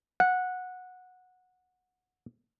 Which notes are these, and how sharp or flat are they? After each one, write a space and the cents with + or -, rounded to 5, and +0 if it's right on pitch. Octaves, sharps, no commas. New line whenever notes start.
F#5 -15